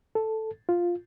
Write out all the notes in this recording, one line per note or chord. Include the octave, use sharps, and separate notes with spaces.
A4
F4